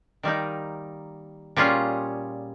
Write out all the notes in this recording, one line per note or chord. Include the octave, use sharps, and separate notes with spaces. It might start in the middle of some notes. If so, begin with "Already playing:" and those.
D#3 G3 A#3 D#4
A#2 G3 C#4 F4 G#4